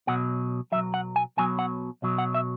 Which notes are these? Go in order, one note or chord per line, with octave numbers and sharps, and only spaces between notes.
B1 B2 F#3 F#5
B1 B2 F#3 E5
F#5
G#5
B1 B2 F#3 G#5
F#5
B1 B2 F#3
F#5
E5